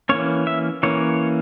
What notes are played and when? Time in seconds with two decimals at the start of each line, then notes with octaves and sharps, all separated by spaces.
0.09 E3 A#3 C#4 C#5
0.47 E5
0.83 E3 A#3 C#4 C#5